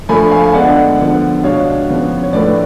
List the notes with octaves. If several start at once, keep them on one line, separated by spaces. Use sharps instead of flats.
F3 A3 D4 G#5 B5
F5 G#5
G#5
D3 G#3 B3 D4 D5 F#5
D3 F3 B3
B2 G#3 D4 C#5 F5
C#3 F3 B3
C#5
A2 F3 A3 D4 B4 D5